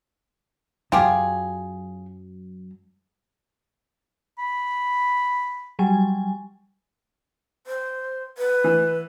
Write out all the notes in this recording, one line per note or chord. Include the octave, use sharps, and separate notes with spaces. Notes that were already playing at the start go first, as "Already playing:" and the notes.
F#2 F#3 F4 G4 G#4
B5
F#3 G3 G#5
C5
B4
E3